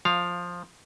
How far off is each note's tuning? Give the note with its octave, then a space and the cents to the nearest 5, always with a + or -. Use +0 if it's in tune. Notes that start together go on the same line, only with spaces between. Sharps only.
F3 +10 F5 +0